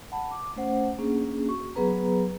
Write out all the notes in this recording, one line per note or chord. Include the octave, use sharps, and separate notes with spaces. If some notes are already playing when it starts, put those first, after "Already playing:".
F#5 A5 B5
D6
A3 C#4 C5 F#5
A#3 C#4 D4 G#4
F#4 C#6
F#3 B3 G#4 B4 A#5